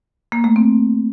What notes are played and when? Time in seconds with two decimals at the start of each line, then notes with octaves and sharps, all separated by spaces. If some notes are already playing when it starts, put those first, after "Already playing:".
0.32 A#3
0.44 A3
0.56 C4